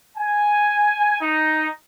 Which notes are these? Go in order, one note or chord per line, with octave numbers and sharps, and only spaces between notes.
G#5
D#4